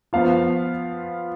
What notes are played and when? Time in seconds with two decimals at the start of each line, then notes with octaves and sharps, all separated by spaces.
0.13 F3 B3 F4 F5